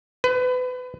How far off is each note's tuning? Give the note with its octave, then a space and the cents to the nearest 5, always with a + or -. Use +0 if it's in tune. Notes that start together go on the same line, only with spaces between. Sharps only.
B4 +30